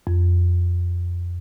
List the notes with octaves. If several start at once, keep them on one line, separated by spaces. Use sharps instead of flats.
F2